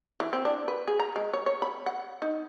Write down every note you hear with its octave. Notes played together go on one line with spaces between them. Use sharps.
E3
C4
D4
B4
G#4
A#5
G#3
C#5
C#5
B5
F#5
D#4